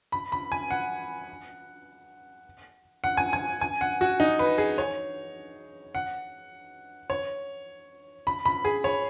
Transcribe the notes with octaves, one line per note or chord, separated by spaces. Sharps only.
B5
B5
G#5
F#5
F#5
G#5
G#5
G#5
F#5
F#4
D#4
B4
G#4
C#5
F#5
C#5
B5
B5
G#4
C#5